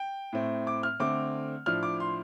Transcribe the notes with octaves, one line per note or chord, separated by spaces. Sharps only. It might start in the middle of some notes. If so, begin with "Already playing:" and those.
Already playing: G5
A2 A3 C4
D6
F6
D3 A3 C4 D6
A2 F3 D4 F6
D6
C6